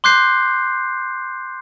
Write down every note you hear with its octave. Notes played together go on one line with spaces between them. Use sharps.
C6 D6 F#6 G6 C7